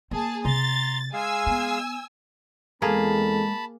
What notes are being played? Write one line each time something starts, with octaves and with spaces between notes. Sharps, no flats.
A#3 G#4 A5
C3 A#5 C6 A6
G#3 G#4 F5 G#5 E6
B3
E2 G#3 A#3 C4 G#4 A4 A5 B5